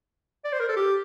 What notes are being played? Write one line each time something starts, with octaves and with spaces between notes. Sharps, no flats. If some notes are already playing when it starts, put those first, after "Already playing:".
D5
C5
A#4
A4
G4